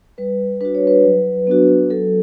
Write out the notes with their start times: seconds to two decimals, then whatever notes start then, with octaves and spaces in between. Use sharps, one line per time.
0.18 G3 B4
0.60 D4 F#4 B4
0.75 C#5
0.87 B4
1.04 F#3
1.47 B3 D4 F#4
1.90 F#3 A4